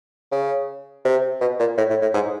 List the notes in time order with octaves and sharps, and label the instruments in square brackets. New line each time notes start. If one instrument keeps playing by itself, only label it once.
[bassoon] C#3
C3
B2
A#2
A2
A2
A2
G#2